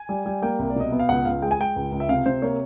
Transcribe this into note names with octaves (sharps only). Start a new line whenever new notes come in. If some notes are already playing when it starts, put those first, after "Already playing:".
Already playing: G#5
G3
G3
A#3 G5
C2
D5
B2 D#5
B3 E5
F5
C#2 F#5
C#2 F5
G#3 G5
G#5
G#3 G5
C#2
C#2
E5
C3 F5
C3 C5
A#3 C#5